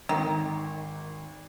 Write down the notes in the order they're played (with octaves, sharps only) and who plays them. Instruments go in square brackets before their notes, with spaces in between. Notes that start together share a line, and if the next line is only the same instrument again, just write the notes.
[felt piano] G#1 [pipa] D#3